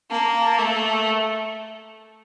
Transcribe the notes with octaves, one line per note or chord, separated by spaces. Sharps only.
A#3 A5
A3